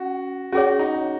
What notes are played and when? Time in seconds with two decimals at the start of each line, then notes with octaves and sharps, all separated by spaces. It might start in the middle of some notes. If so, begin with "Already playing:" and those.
Already playing: C#4 F#4
0.52 C#4 F#4 G#4 C#5
0.79 D#4